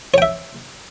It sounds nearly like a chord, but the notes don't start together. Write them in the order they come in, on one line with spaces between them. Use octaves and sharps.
C#5 G5 E5